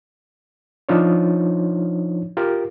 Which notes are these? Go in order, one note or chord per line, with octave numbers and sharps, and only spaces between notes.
F3 D4 D#4 F4 C5 C#5
F4 G4 A#4